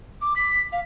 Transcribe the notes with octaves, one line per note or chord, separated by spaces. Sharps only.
D6
B6
F5